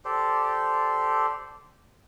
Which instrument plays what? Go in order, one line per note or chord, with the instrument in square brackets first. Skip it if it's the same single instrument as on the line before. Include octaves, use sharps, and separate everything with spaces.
[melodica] G4 A4 C5 D5